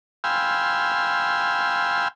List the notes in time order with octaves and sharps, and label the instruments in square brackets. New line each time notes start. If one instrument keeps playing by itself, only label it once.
[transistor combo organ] F5 G5 G#5 B5 C6 E6